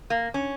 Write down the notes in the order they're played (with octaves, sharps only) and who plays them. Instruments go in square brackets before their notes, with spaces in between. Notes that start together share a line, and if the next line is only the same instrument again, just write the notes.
[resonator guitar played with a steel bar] A#3
C#4